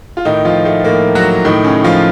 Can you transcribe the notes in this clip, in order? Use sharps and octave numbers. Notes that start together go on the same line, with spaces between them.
F4
A2 D#3 D#4
F3 F4
A3
A2 A#3
F#3 F#4
A2 D#3 D#4
C#3 C#4
F3 F4